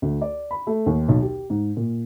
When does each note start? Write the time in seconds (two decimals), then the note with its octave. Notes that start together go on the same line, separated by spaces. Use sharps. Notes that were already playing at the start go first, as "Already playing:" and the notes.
0.02 D2
0.22 D5
0.51 B5
0.67 A3
0.86 D#2
1.09 B1
1.22 G4
1.50 G#2
1.77 A#2